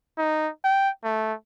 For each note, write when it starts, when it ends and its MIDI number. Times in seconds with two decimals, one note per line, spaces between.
0.18 0.50 63
0.64 0.90 79
1.04 1.34 57